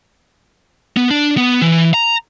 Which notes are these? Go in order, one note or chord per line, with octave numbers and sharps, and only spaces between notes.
B3
D4
B3
E3
A#5